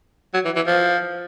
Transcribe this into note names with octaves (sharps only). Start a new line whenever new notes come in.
F#3
E3
E3
F3